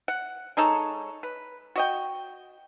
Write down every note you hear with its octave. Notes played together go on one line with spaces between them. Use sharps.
F#5
G#3 D#4 A4 C#5
B4
F#4 D#5 G5